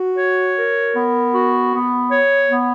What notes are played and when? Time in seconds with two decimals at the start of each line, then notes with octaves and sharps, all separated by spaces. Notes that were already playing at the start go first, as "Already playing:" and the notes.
Already playing: F#4
0.18 C#5
0.56 A#4
0.96 B3
1.34 F#4
1.73 B3
2.11 C#5
2.49 B3